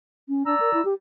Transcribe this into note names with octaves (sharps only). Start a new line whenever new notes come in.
C#4
D4 D5 A#5 E6
A#4
E4
G4